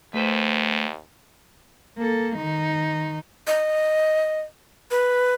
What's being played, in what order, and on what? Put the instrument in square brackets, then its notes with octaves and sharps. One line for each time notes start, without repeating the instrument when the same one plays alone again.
[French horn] D#2 [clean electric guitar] A3 B4 C5
[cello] A#3 A4
D#3 D#4
[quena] D#5
B4